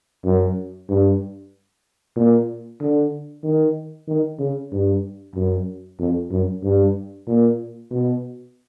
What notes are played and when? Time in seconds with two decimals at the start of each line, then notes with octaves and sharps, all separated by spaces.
0.25 F#2
0.89 G2
2.16 A#2
2.81 D3
3.44 D#3
4.08 D#3
4.39 C#3
4.72 G2
5.35 F#2
5.99 F2
6.31 F#2
6.64 G2
7.27 A#2
7.91 B2